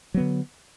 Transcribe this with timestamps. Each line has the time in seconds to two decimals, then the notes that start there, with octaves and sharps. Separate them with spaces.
0.14 F#3
0.17 B3
0.20 D3